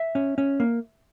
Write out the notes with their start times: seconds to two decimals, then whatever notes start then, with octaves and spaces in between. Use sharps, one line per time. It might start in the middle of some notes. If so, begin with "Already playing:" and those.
Already playing: E5
0.15 C#4
0.38 C#4
0.60 A#3